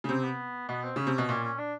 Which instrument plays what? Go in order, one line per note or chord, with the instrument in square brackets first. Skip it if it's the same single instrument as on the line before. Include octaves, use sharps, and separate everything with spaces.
[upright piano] C#3
[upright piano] C3 [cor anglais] C4
[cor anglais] B3
[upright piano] B2 [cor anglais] B3
[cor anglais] C4
[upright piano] C#3 [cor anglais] C#4
[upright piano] C3
[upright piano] B2 [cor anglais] C#4
[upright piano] A#2 [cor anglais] C#4
[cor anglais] C#4
D4